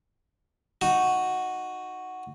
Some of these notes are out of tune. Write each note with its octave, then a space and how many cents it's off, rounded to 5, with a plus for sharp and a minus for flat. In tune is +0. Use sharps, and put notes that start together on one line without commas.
D#4 +0 F#4 +0